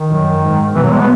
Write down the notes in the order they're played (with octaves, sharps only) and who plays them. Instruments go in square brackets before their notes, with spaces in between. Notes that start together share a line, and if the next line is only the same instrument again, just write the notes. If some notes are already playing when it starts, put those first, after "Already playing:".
Already playing: [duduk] D#3
[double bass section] F#2
G#2
[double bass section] B2 [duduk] E3
[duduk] F#3
G#3
B3